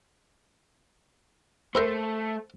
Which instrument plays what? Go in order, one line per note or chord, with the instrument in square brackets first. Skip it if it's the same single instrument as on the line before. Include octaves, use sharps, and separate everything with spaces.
[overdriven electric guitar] A3 [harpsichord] A#4 E5 B5 [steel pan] C5